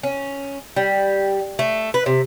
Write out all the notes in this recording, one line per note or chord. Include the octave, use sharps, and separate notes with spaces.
C#4
G3
A3
B4
C3